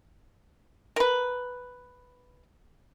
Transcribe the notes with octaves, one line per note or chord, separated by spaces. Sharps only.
A#4 B4